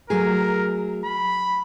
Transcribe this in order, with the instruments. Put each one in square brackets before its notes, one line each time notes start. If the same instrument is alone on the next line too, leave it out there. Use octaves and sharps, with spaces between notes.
[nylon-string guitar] F#3 A3 G#4 [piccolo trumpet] A#4
[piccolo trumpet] B5